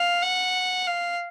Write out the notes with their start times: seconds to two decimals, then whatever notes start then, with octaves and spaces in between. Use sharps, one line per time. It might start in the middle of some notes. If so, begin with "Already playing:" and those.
Already playing: F5
0.22 F#5
0.87 F5